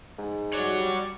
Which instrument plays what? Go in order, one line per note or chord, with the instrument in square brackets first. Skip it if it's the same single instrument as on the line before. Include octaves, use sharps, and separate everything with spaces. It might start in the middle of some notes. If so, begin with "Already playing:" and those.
[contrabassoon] G#2
[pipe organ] G3 F#4 [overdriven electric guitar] C#5 F#5 [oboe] D5